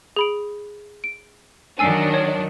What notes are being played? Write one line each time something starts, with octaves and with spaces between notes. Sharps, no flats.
G#4 B5 D7
D7
D#3 F#3 D4 G#5 E6 C7
C#5